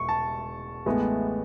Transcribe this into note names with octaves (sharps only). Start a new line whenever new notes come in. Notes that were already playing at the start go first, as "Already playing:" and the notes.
Already playing: E1 E2 B2 C#6
A5
A1 A2 G#3 B3